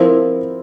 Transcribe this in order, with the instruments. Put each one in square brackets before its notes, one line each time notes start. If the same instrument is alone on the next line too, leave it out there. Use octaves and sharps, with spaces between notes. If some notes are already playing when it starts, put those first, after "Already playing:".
Already playing: [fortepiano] F3 C4 E4 A#4